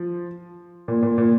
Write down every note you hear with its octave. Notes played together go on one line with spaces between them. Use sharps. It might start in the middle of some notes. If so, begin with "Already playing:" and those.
Already playing: F3
A#2
A#2
A#2